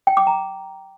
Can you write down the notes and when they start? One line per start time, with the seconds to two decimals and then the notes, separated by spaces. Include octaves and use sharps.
0.07 G5
0.17 D6
0.27 A#5